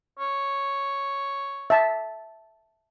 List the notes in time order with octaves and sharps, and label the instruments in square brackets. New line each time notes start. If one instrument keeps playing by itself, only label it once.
[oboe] C#5
[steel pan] E5 A5